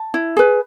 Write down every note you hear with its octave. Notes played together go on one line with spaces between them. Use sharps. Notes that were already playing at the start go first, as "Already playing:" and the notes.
Already playing: A5
E4
G#4 B4